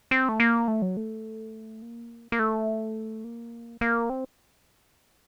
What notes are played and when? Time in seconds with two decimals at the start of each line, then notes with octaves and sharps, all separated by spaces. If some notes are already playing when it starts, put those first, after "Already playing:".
0.11 C4
0.29 A3
0.40 A#3
0.68 A3
0.82 F#3
0.97 A3
1.82 A#3
2.32 A#3
2.39 A3
3.24 A#3
3.81 A#3
4.10 C4